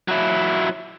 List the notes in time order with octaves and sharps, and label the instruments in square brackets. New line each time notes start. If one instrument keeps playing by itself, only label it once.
[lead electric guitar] F#3 E4